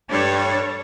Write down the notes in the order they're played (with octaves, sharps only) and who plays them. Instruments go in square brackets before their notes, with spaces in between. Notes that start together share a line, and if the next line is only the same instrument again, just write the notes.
[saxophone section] G2 [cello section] D4 A4 C#5